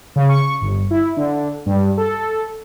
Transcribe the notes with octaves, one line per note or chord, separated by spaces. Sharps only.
C#3
C#6
G1
E4
D3
G2
A4